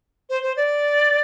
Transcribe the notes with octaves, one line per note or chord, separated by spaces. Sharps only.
C5
C5
D5